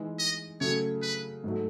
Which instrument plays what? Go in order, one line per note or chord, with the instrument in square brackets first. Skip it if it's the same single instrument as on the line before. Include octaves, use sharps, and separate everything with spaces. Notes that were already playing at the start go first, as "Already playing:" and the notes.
Already playing: [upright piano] E3 G#3 D#4 G#4
[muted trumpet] D#5
[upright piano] C#3 F#3 A3 [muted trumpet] C#5
[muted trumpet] B4
[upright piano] G#2 F#3 A3